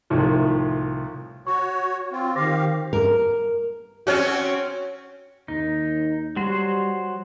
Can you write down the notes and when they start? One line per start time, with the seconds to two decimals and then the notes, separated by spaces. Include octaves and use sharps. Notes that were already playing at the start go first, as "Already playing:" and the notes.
0.10 C2 A2 D#3 F3
1.47 F#4 C#5 C#6
2.12 C4 F4
2.36 D#3 G4 C5 F5 D6 A#6
2.93 A#4
4.07 C4 C#4 F#4
5.48 D#2 D#4
6.36 F#3 G3 F#4 C5